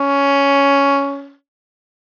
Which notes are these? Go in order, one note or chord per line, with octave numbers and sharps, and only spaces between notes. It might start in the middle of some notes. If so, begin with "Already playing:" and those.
Already playing: C#4